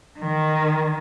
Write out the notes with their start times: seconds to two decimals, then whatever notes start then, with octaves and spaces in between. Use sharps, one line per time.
0.20 D#3